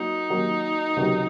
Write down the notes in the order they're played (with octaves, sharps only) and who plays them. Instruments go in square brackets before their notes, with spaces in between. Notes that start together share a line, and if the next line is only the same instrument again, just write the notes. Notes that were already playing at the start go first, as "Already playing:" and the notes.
Already playing: [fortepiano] F#3 A#3 [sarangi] D#4
[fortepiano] D#3 F#3 A#3
C#2 C3 D#3 F#3